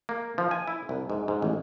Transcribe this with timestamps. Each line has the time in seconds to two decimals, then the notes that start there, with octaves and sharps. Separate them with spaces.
0.09 A#3
0.38 F3
0.51 G#5
0.67 E4
0.89 C2
1.10 G#2
1.28 G#2
1.42 A1